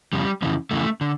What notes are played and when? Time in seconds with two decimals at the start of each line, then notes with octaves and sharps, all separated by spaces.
0.13 F2 C#3 G3
0.42 F2 C#3 E3
0.71 F2 C#3 E3 A3
1.01 D3